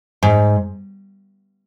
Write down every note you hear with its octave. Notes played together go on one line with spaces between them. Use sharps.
G#2